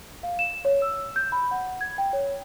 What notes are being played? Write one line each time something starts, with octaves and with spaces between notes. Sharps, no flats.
F5
E7
C#5
E6
G6
B5
F#5
G#6
G5
C#5